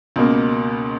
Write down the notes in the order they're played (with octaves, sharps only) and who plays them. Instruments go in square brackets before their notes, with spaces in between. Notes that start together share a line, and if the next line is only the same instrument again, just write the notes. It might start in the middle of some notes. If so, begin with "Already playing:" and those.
[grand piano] C#2 B2 A#3